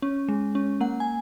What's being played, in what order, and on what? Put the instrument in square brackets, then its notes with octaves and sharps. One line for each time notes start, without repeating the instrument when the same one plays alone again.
[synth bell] C#4
G#3
C#4
A#3 F#5
G#5